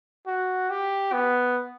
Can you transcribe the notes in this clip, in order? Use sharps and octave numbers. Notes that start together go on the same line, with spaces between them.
F#4
G4
B3